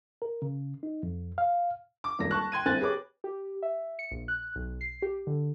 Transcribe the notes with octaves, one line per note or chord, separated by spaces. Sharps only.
A#4
C#3
D#4
F2
F5
D6
D#1 G#1 A#6
A5 C#6 F#6
G5 C6 G#6 D#7
G1 C4 E4 G#5 F#6 A6
G4 G#4 B4 C#5 D6
G4
E5
C#7
A#1
F#6
B1
C7
G4
D3